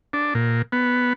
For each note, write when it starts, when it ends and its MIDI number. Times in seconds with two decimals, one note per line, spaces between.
0.13 0.34 62
0.35 0.62 46
0.72 1.13 59